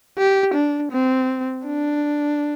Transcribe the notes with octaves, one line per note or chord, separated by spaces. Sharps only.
G4
D4
C4
D4